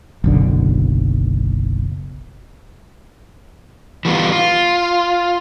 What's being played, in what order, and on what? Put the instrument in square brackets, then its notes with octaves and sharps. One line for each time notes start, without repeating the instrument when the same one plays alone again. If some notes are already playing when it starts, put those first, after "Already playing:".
[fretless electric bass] F#1 B1 D3
[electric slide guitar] E3 G3 B3 F4
F4